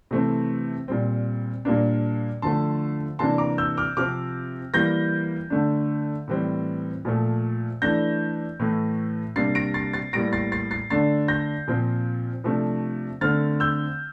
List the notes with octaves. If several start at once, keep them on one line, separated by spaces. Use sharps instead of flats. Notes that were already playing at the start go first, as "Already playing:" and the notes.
C3 E3 A3 C4
A#2 G3 C4
A#2 G3 A#3 D4
D3 F3 A3 A5 C6
C3 E3 A#3 D4 A5 C6
A#5 D6
E6 G6
D6 F6
C3 F3 C4 D6 F6
E3 G3 A#3 G6 A#6
D3 A3 D4
A2 E3 G3 C4
A#2 F3 A3
E3 A3 D4 G6 A#6
A2 E3 A3
C3 G3 A#3 D4 A6 C7
A#6 D7
A6 C7
A6 C7
A2 G3 A#3 A#6 D7
A6 C7
A6 C7
A6 C7
D3 A3 D4 A6 C7
G6 A#6
A#2 F3 C4
C3 F3 A3 D4
D3 A3 C4 F6 A6
E6 G6